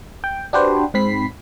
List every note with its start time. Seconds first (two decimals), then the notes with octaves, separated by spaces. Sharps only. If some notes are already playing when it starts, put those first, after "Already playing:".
0.24 G5
0.53 D4 F#4 G4 B4 C5
0.94 G#2 C4 B5 B6 C7